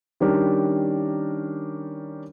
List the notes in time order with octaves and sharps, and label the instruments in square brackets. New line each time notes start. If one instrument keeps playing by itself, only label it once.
[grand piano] D#3 G3 C#4 D4 G4 A#4